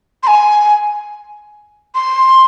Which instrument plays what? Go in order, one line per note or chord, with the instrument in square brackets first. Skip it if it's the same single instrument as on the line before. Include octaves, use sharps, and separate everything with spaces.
[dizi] C6
G#5
C6